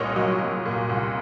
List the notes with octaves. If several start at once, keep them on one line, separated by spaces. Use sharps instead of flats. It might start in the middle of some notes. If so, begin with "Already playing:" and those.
Already playing: C2 A#2 C#5 D#5
F#3
F#3
A#2
C2